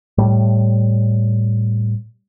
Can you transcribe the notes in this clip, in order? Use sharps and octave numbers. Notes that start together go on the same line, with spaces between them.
A2 G3